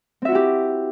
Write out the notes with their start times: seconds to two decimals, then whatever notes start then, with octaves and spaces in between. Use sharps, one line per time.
0.22 C4
0.25 E5
0.28 F#4
0.32 E4
0.35 G4